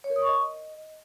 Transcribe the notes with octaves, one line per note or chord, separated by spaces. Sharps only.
C#5
A#4
D#6
C#6
D#5